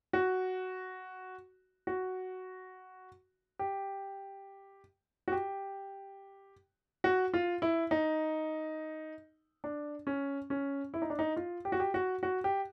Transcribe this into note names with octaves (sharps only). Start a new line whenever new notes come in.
F#4
F#4
G4
F#4
G4
F#4
F4
E4
D#4
D4
C#4
C#4
E4
D#4
D4
D#4
F4
G4
F#4
G4
F#4
F#4
G4